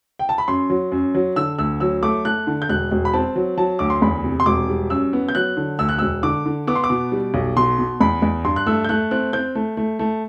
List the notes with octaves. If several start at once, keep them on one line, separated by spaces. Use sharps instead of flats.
G5
A5
B5
F#2 C6
F#3
F#2
F#3
D3 E6
D2 E6
F#3 E6
A3 D6
A3 F#6
D3
G6
E1 F#6
E1
B5
C4 A5
F#3
F#3 A5
D2 D6
C6
E2 B5
C3
C6
E1 D6
G3
F#2 E6
B3
G6
F#3 F#6
D3
D2 E6
F#6
E1 E6
D3 D6
D3
B3 D6
C6
D6
B2
G3
B1
B2 C6
B2
E2 B5
E2
G2 C6
F#6
A3 E6
G6
A3 F#6
C4 F#6
C4 G6
A3
A3
A3